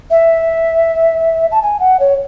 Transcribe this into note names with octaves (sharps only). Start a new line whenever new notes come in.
E5
A5
G#5
F#5
C#5